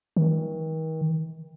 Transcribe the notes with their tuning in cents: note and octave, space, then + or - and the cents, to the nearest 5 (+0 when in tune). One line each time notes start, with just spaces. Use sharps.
D#3 +40